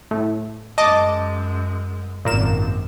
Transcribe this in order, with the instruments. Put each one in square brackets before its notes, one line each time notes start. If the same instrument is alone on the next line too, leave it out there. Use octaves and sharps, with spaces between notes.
[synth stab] A2
[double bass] F#2 G#3 [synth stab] D#5 A5 D6
[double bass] G#1 F#2 [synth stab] A#2 A#3 E7